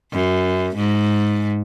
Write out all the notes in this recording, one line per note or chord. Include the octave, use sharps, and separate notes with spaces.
F#2
G#2